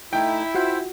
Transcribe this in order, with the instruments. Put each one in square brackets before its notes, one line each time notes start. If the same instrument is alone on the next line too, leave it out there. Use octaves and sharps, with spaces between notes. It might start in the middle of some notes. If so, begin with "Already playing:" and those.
[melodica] A3 D#4 [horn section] E4 [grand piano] G5
[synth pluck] F4 F#4 F#5 [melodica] C5 E5